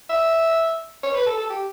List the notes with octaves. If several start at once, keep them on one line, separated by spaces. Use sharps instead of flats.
E5
C#5
B4
A4
A4
G4